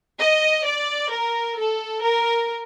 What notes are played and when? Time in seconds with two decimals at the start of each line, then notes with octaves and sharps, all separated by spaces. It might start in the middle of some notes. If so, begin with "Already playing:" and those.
0.19 D#5
0.64 D5
1.10 A#4
1.57 A4
2.03 A#4